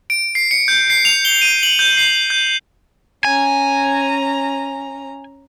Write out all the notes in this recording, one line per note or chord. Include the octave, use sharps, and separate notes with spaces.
D7
C7
C#7
G6
C7
F7
G7
D#7
F#7
G6
C7
G6
C#4 G#5 A#5